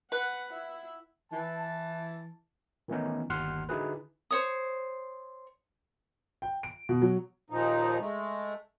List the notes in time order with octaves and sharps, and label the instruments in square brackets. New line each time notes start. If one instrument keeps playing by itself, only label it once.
[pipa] B4 [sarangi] F#5
[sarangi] E4
[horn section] E3 A5
[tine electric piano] D#3 E3 A3 B3 C#4 D#4
G1 D#2 F#5 C6 F6
D3 D#4 E4 F#4 G#4 B4
[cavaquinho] C5 C#5 D#6
[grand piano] G5
D7
B2
F#3
[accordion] D#2 A#2 F3 D#4
G#3 A3